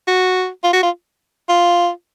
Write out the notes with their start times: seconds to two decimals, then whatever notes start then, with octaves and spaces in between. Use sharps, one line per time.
0.08 F#4
0.64 F4
0.73 F#4
0.83 F4
1.49 F4